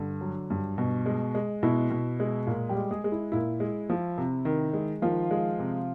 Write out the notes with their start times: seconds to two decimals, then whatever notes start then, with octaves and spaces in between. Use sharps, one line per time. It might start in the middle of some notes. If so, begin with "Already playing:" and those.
Already playing: G2 D3
0.21 F#3
0.50 G2
0.78 B2
1.06 G#3
1.35 G#3
1.63 B2 E4
1.90 B2
2.20 G#3
2.47 A#2
2.69 G3 G4
2.76 G#3
2.91 G#3 G#4
3.04 G#3
3.12 E4
3.32 A#2 E4
3.60 G#3
3.90 F3
4.18 C3
4.45 D#3
4.73 G#3
5.02 D#3 F3 F4
5.31 G#3
5.59 C3